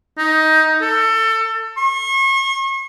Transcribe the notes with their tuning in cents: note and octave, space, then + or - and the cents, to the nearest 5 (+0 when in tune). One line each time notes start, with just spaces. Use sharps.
D#4 +15
A4 +25
C#6 -40